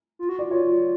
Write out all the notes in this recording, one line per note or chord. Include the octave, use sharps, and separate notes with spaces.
F4
F#4
D5
F4 C#5